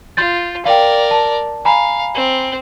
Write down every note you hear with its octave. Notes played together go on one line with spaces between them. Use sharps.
F4 C6 G6 A6
A#4 D5 F5 G5
A5
F5 G#5 A#5 B5
C4